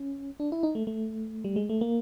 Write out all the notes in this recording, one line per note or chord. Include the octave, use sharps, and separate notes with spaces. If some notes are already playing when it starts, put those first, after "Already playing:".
Already playing: C#4
D4
E4
D#4
A3
A3
G3
G#3
A3
A#3